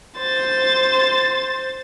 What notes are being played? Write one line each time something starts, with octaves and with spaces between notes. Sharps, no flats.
C5 A6